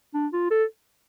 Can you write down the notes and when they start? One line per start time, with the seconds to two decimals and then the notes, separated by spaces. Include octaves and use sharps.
0.14 D4
0.33 F4
0.51 A4